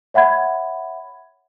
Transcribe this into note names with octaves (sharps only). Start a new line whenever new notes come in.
C#5 E5 F#5 B5 G#6